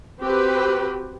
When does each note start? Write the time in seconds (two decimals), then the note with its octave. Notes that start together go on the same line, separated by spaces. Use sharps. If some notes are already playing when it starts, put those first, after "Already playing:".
0.21 C4 F#4 G4 B4